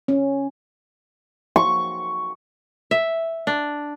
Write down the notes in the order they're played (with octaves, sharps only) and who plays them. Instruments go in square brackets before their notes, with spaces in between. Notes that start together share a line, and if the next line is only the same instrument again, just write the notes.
[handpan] C#4
[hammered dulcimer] C#6
[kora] E5
D4